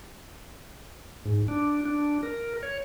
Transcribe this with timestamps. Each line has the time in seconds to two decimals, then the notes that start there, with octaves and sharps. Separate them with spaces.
1.25 G#2
1.48 D4
1.85 D4
2.23 A#4
2.63 C#5